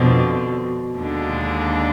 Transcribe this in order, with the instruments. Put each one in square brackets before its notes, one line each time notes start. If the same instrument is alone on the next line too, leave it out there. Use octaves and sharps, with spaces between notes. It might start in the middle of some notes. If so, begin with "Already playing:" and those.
Already playing: [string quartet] F2 D3 F3 C4 [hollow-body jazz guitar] B2
[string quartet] D#2 D3 G#3 D4